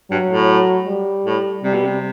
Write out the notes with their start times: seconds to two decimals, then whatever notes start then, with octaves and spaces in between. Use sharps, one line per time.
0.11 G2 F#3
0.30 A2
0.87 G3
1.26 A2
1.64 C3 G3
1.74 B2
1.84 C3